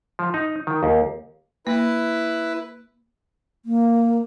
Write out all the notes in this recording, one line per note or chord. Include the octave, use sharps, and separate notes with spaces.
F3
D#4
D#3
D#2
A#3 E4 B4
A#3